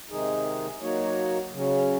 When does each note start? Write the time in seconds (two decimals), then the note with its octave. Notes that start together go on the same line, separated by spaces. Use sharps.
0.10 C3 D#3 G#3 D#4 G#4
0.81 F#3 A#3 D#4 F#4 C#5
1.53 C#3 F#3 C#4